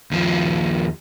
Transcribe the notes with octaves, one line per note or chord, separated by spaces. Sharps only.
D#2 F3